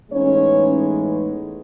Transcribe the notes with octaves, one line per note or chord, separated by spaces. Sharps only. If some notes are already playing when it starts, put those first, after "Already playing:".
A2 E3 G#3 B3 C#4 D#4 C#5